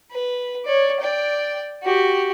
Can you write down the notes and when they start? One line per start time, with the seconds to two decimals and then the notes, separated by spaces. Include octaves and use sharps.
0.11 B4
0.65 C#5 D5
1.00 D5 G5
1.83 F#4 G4